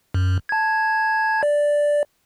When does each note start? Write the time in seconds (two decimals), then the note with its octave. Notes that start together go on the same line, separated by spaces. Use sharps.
0.14 F#2
0.49 A5 G#6
1.43 D5